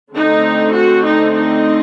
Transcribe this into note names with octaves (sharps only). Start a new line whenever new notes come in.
D3 A3 C4 D#4
F#4
D#4
D#4